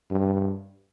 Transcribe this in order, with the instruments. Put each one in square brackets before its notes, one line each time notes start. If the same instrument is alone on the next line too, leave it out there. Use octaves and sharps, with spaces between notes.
[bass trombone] G2